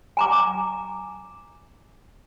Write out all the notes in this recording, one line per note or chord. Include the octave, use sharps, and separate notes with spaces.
G#5 A#5 D6